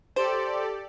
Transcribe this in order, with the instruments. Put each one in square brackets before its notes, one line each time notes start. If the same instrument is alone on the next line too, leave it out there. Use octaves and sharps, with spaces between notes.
[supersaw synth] G4 A4 D5 [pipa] C5